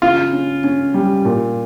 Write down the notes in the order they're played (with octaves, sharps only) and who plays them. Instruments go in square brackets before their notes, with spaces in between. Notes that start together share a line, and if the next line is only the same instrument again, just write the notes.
[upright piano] C#3 [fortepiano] F4
[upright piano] C#4
C#4
G3
A#2